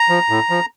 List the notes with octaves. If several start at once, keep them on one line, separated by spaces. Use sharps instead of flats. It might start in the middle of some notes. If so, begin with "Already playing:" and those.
Already playing: A#5
F3
A2
F3